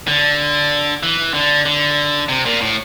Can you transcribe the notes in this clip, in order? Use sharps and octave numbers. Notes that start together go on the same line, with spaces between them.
D3
E3
D3
D3
C3
A#2
A2